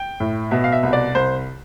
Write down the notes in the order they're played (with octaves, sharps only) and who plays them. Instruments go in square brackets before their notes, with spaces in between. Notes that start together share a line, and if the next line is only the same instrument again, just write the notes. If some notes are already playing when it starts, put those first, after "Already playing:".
Already playing: [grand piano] G5
A2
B2 E5
F5
E5
C2
D5
C2 C5